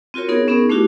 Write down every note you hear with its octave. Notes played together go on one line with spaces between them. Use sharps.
C4 F4 F#4 A#4 C#5
B3 D#4 G#4 A#4
B3 C#4 D#4 G#4 A#4
A3 D4 E4 F#4 G4